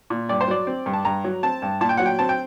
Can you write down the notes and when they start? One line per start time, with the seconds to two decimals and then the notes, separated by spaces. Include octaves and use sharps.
0.10 A#2
0.29 G2 D5
0.41 C5
0.48 F#3 D5
0.67 C4
0.86 G2
0.93 A5
1.05 G2 A#5
1.24 F#3
1.43 C4 A5
1.62 G2
1.81 A#2 A5
1.89 G5
1.97 F#3 F#5
2.06 G5
2.19 C4 A5
2.29 G5